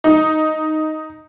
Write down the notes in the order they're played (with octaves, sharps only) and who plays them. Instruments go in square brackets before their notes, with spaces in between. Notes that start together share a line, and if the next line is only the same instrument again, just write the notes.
[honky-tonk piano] D#4